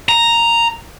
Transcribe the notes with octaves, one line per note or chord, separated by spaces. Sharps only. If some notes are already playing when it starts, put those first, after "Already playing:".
A#5